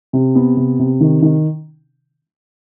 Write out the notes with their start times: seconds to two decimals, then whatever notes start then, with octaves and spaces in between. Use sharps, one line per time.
0.13 C3
0.35 B3
0.57 C3
0.79 C3
1.00 D#3
1.22 D#3